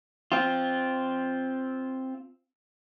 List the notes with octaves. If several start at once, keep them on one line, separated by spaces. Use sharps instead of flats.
C4 F4